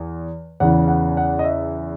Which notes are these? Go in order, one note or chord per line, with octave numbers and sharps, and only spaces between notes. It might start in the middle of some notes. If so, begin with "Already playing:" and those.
Already playing: E2
E2 C#3 E3 F#5
F#5
F#5
D#5
E5